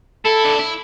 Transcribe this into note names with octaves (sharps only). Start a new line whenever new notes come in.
E4 A4
D4
E4